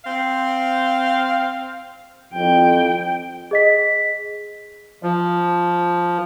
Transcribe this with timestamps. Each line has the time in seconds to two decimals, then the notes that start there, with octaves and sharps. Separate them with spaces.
0.04 C4 F5
2.34 F2 G5
3.51 G#4 D#5 B6
5.03 F3